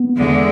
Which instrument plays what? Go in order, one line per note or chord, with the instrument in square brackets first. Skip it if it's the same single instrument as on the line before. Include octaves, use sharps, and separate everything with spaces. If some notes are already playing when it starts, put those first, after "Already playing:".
Already playing: [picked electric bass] B3
[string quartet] E2 D3 G#3